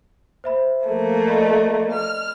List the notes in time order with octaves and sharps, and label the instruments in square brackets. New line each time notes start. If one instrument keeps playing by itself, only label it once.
[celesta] C5 E5 B5
[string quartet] F3 A3 A#3
[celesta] D5 D#5 B5
[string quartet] F6